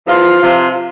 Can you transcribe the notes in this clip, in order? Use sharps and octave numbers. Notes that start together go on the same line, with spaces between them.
E2 F3 F4
C3 F3